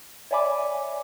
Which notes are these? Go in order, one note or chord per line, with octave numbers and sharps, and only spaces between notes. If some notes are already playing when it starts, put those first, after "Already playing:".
C#5 D5 E5 G#5 B5 D6